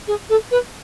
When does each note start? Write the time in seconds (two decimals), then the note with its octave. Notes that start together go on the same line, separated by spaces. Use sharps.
0.07 G#4
0.29 A4
0.51 B4